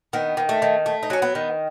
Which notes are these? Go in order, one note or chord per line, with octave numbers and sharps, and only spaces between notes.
D#3 B3
D#3
A3
D#3
A3
D#4
F#3 C#4
B3
D#3